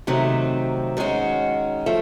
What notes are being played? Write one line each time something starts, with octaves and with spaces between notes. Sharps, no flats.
C3 D#3 F#3 A3 C4
D#3 G#3 C#4 F#4
F3 A3